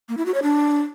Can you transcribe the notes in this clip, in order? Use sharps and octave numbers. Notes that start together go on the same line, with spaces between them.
A#3
E4
F#4
C#5
D4